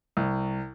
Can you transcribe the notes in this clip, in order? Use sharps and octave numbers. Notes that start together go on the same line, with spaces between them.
C2